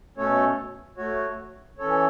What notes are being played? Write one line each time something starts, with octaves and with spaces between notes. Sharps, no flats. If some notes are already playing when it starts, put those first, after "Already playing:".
B2 A3 C#4 A4 C#5
A3 F#4 C#5
E3 C#4 A4 C#5